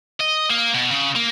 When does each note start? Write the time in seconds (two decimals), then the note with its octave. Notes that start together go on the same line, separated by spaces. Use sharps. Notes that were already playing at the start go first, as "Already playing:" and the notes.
0.20 D#5
0.50 A#3
0.74 B2
0.91 C#3
1.16 A#3